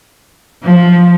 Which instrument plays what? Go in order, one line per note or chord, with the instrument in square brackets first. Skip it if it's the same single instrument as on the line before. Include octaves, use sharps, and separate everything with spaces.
[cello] F3